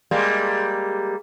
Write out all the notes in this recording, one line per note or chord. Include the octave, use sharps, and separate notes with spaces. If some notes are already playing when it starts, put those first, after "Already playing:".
G3 G#3 A#3